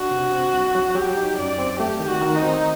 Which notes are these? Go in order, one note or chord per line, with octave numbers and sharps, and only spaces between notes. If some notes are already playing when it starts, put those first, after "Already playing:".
Already playing: D4 F#4
C3
C4
C2
F#3
F#3 G4
D#4
F#2 D5
C4
A3 G4
D#3
F#4
D#3
D#4
C4